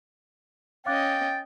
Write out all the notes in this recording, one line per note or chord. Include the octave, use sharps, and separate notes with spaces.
C#4 D#5 F5 G5 D6 F#6 A6